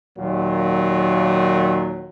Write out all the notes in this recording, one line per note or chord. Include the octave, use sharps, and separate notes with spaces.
D#2 A#2 F#3